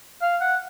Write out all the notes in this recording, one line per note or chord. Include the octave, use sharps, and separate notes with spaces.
F5
F#5